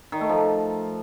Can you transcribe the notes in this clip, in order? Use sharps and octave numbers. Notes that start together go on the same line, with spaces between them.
D#3
A3
F3